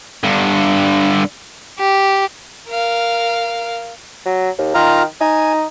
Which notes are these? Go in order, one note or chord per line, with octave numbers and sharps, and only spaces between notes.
G2 D3
G4
A#4 F5
F#3
D#2
D#3 F4 F5 A#5
D#4 G#5